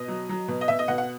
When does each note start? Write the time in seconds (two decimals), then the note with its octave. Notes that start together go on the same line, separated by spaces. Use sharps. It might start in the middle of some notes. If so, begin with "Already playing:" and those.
Already playing: B2 D#5
0.08 F#3
0.29 F#3
0.48 B2
0.61 D#5
0.68 B2 E5
0.79 D#5
0.88 B2 F#5
0.98 F#5